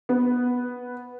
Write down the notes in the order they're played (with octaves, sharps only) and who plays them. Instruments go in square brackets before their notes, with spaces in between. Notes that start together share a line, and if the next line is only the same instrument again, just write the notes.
[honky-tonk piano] B3